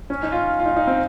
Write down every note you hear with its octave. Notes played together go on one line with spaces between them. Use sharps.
C#4
D#4
F4
F4
D#4
D#4
C4